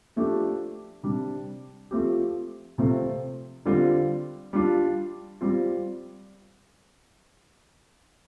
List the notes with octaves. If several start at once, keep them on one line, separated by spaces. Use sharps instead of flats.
F3 A3 D4 G4
C3 G3 D4
F3 A3 C4 G4
C3 F3 A3 C4 F4
D3 G3 C4 F4
G3 D4 F4
G3 C4 F4